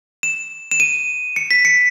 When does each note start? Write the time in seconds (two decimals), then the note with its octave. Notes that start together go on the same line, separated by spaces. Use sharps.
0.23 E7
0.71 E7
0.80 D#7
1.36 C#7
1.51 B6
1.65 C#7